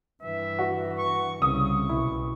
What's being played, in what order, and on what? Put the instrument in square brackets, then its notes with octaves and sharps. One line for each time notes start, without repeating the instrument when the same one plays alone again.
[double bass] G2 E3 [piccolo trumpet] E5
[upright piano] F#4
[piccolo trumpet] C#6
[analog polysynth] C2 [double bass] C#3 [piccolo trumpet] C#6 [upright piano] D#6
[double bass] B1 [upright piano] E4